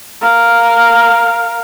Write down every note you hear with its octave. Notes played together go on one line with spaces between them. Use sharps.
A#4 F5